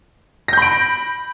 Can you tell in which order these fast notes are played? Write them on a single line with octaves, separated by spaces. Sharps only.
A#6 G6 B5 D7